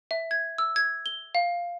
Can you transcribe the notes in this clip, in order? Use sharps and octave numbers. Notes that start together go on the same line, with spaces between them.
E5
G#6
E6
G#6
G7
F5